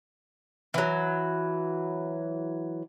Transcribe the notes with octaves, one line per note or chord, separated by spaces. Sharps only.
E3 F#3